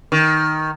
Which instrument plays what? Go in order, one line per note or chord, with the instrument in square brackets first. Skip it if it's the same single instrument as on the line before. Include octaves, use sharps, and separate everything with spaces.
[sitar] D#3